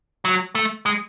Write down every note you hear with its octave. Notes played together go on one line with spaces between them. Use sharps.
F#3
A3
G#3